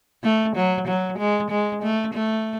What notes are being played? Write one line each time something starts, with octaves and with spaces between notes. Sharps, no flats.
A3
F#3
F#3
G#3
G#3
A3
A3